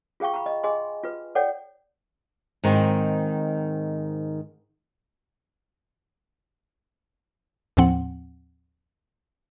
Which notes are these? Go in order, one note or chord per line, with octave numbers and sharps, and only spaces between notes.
F4 G#4 F5 G5 C#6
A#5 B5
D#5
G#4 D#5 G#5 C6
F4 B4
A4 C#5 D5 F#5 G5
G#2 D#3 C4
D#2 A2 F3 C4 F#5